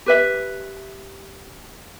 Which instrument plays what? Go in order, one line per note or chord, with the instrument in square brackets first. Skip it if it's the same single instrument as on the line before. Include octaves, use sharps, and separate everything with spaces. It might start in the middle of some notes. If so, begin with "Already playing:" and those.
[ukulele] G4 B4 E5